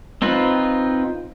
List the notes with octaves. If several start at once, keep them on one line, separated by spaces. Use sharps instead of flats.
C4 D#4 F4 B4